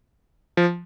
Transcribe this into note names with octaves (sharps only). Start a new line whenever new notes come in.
F3